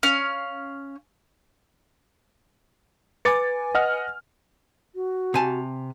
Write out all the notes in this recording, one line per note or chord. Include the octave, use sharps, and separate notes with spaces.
C#4 F5
B4 G#5 D6 A6 C#7
D#5 F#5 F6
F#4
C3 G#5 A5